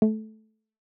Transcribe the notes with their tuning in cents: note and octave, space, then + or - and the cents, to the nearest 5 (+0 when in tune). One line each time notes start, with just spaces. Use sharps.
A3 -15